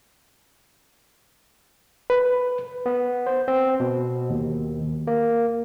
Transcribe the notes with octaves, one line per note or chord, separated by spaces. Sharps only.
B4
B3
C5
C4
B2
D#2
A#3